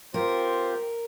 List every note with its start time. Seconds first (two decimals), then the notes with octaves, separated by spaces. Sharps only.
0.14 C4 F4 G4 A#4 C5